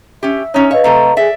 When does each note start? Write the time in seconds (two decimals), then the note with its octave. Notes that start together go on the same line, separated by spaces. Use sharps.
0.23 C#4 G4 E5
0.54 C#4 D#4 C#5 A#5
0.71 B4 C#5 D#5 F5
0.84 C3 A3 A4 A#5
1.17 G#4 D5 E5